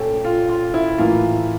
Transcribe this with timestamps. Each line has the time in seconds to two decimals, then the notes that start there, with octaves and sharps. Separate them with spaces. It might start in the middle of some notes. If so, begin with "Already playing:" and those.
Already playing: A#2 A3 C#4 G4 A4
0.25 F4
0.49 F4
0.74 E4
0.98 A2 E3 A#3 E4 F4